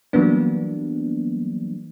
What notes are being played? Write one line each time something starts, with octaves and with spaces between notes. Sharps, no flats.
E3 F#3 G3 A#3 B3 D4